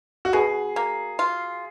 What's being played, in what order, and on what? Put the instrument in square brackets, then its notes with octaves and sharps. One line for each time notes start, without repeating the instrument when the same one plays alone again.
[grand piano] F#4
[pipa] B2 [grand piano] G#4
[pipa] A#3
F4